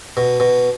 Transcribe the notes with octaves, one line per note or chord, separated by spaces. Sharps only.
B2
B2